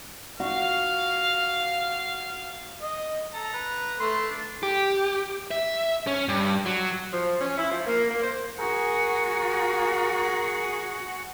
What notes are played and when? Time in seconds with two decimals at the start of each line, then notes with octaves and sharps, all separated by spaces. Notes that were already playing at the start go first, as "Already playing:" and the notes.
0.40 F#4 F5
2.82 D#5
3.34 A4 A#5
3.54 B4
4.00 A3 C6
4.30 D4
4.63 G4
5.51 E5
6.07 C#4
6.28 G2
6.66 F#3
7.12 F3
7.41 C#4
7.58 E4
7.70 F3
7.86 A#3
8.09 A#3
8.23 C5
8.59 F#4 G#4 A#4